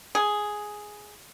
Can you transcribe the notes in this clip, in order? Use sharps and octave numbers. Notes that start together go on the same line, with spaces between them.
G#4